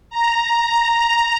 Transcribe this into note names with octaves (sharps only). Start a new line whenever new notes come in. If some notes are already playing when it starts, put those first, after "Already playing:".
A#5